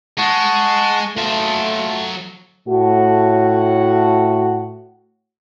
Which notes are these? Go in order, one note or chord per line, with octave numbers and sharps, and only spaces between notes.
G#3 F#5 A5 C#6
F#3 A3 F4 A5
A2 A3 F#4